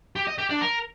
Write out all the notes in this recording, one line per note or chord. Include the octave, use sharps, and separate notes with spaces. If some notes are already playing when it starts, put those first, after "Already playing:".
G4
D#5
G4
D4
A#4